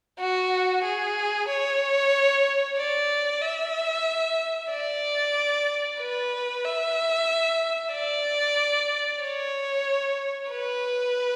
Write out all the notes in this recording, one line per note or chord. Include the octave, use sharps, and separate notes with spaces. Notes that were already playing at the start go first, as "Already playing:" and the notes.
F#4
G#4
C#5
D5
E5
D5
B4
E5
D5
C#5
B4